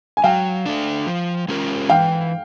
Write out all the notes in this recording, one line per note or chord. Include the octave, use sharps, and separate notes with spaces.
G#5
F#3 F5 G5
A3 D4
F3
G#3 C#4 F4 A#4
E3 F5 G5